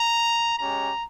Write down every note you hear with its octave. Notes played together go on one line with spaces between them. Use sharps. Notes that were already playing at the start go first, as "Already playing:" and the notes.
Already playing: A#5
G#3 C#4 G4 A#5